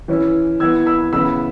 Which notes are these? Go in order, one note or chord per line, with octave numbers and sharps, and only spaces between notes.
E3 C#4 E4
E3 B3 E4 E6 G#6
B5 E6
C#3 E3 B3 E4 B5 E6